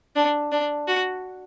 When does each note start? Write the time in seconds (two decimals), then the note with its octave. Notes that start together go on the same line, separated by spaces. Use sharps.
0.16 D4
0.52 D4
0.87 F#4